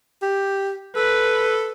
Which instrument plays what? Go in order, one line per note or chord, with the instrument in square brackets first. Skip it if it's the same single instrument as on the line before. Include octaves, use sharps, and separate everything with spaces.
[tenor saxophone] G4
[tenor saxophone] A4 [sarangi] B4